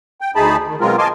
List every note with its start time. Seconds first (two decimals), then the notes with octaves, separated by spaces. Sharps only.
0.21 G5
0.36 D2 A3 D#4 G#4 A5 B5
0.68 D#3
0.81 B2 F#3 G#3 C4 F4 A#4
0.98 D#5 F5 G#5 A5 C6 D6